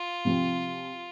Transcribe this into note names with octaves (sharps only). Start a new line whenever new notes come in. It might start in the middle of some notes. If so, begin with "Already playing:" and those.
Already playing: F4
C3 F3 C4